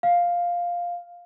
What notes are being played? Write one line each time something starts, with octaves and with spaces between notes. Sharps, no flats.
F5